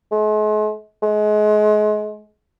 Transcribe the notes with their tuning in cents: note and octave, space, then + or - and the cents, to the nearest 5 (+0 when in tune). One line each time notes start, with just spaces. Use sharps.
G#3 +45
G#3 +30